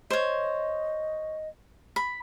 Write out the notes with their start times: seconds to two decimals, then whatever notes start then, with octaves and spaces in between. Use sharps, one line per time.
0.10 C5 C#5 D#5
1.96 B5